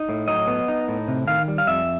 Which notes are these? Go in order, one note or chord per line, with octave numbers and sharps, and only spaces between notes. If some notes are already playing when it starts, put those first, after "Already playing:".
Already playing: D#4
A2
F#3 D#5
B3
D#4
A2
C3
D#3 F5
G3
F5
F2 E5